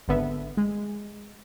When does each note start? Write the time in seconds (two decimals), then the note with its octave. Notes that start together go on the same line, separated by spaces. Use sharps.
0.08 G#1 D3 B3 E5
0.57 G#3